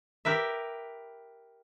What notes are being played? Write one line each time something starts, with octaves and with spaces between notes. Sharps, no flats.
G4 A#4 B4 E5